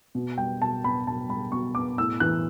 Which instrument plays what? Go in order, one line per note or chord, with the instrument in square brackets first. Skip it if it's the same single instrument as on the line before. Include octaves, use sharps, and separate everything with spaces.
[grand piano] B2
G3 G5
B2 A5
B3 B5
B2 A5
G3 B5
B2 C#6
B3 D6
A2 E6
E3 F#6